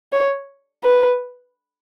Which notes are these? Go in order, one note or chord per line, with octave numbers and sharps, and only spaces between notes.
C#5
B4